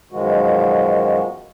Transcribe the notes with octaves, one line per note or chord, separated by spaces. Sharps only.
F#2 B2 D#3 F3 G#3 F#4